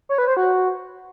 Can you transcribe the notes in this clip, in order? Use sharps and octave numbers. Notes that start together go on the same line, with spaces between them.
C#5
B4
C5
F#4